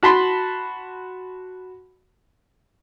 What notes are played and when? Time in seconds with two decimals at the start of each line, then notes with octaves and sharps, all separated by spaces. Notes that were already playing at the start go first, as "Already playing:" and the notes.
0.03 F#4 A5 B5 C6